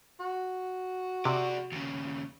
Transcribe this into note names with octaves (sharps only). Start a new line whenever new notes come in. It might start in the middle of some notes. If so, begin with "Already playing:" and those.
F#4
C3 G#4 D5
D#2 C#3